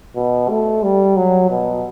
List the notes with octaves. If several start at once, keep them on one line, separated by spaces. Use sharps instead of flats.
B2
A3
G3
F#3
B2